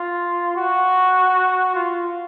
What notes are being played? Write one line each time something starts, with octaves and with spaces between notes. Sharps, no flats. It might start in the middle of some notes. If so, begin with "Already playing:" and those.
Already playing: F4
F#4
F4